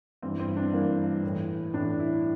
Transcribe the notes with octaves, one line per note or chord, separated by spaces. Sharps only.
G2 E3 C4
C4
D4
G2 E3 A#3
A2 E3
A2 E3 D4
E4